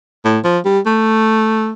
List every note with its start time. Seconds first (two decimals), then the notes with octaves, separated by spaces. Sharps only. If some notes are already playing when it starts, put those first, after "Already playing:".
0.24 A2
0.44 F3
0.65 G3
0.86 A3